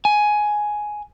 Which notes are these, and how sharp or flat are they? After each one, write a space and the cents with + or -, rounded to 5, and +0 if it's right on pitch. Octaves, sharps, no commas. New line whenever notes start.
G#5 +10